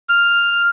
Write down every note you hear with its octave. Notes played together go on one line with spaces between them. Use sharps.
F6